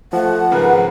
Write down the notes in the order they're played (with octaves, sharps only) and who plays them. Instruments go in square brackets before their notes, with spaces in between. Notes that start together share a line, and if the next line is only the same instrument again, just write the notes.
[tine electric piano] F3 [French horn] A3 [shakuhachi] F#5
[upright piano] G#1 C#3 A#4 [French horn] B4